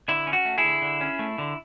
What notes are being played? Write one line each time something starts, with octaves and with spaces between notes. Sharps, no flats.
D3 E4
C#4
F#4
A3
E4 G#4
D3
D3
C#4
A3
D3